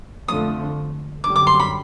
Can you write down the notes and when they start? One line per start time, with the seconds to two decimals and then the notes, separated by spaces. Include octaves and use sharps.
0.28 F2 D3 F3 A3 D#6
1.23 F#2 D3 G3 D6
1.36 D6
1.47 C6
1.60 B5